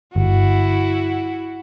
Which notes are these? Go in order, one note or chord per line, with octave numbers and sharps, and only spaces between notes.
G1 E4 F#4